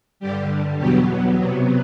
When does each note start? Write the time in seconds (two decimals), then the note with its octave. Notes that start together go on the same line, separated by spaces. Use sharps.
0.20 G2 D3 G3 G4
0.78 E2 B2 F#3 B3 G4
1.38 C3 F#3 B3